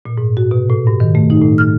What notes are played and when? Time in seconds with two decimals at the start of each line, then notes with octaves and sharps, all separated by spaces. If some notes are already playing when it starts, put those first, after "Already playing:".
0.05 A#2
0.18 G#2
0.37 F#4
0.51 B2
0.70 A2
0.87 G2
1.00 D#3
1.15 A3
1.30 D#4
1.42 A2
1.58 F6